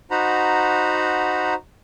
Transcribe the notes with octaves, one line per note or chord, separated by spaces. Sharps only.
D#4 F#4 C5 F#5 A#5 B5